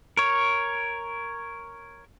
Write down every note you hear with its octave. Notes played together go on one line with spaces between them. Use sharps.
A#4 C#5